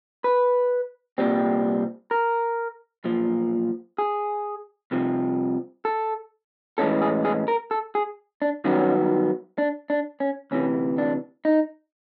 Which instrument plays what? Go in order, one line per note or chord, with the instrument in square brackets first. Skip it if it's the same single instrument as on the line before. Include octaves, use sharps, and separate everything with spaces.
[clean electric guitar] B4
C2 A#2 G3 C4
A#4
B1 A#2 F3
G#4
C2 C3 F3
A4
A2 E3 G#3 C#4 A4
G#4
G#4
A#4
A4
G#4
D4
G2 D#3 F#3 B3 C#4
D4
D4
C#4
D2 C3 E3 C#4
D4
D#4